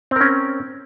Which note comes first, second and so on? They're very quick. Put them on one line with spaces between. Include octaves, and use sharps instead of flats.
C4 A#4 C#4